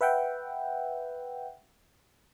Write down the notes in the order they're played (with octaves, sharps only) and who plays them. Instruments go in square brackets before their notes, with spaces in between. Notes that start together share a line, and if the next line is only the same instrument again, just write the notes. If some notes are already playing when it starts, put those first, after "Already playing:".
[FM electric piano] B4 E5 F#5 G5